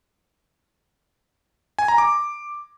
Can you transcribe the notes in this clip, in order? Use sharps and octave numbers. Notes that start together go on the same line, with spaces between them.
G#5
A#5
D6